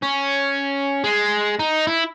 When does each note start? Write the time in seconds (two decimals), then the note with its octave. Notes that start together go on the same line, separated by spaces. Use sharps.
0.03 C#4
1.04 G#3
1.59 D#4
1.87 E4